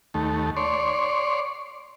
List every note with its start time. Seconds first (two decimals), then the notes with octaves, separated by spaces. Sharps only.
0.14 D#2 A3
0.57 C#5 D5 C6